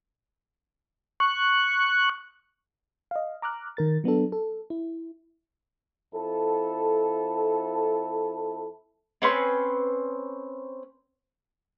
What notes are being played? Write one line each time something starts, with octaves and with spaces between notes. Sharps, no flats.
C#6 F#6
D#5 F5
A#5 D6 F6 F#6
D#3 A#4 A6
F#3 B3 D4 A4
A4
E4
F2 E4 A4
C4 C#4 B4 C6